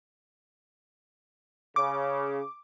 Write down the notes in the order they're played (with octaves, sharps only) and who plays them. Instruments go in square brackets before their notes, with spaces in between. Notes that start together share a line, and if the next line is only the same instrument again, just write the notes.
[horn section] C#3 [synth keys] D6